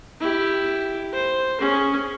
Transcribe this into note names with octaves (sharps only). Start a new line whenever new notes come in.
E4 G4
C5
C#4 G#4